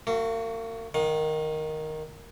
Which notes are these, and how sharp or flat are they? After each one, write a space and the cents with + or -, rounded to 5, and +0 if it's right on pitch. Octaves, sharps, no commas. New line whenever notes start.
A#3 -40 F#4 +0
D#3 +0 F5 +45